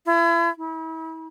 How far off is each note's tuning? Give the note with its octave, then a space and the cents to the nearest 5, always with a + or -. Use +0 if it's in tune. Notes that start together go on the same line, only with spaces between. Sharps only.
E4 +35
E4 -40